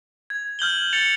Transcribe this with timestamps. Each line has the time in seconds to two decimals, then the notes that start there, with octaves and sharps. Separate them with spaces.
0.30 G#6
0.59 F6 G6 F#7 G7
0.92 A6 C#7 F7 G7